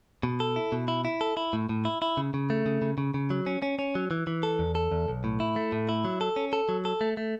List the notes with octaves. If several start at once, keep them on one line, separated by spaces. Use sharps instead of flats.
B2
A4
E4
B2
E4
E4
A4
E4
A2
A2
E4
E4
C#3
C#3
A3
C#3
C#3
C#3
C#3
F#3
C#4
C#4
C#4
F#3
E3
E3
A4
E2
A4
E2
B1
A2
E4
A3
A2
E4
F#3
A4
C#4
A4
F#3
A4
A3
A3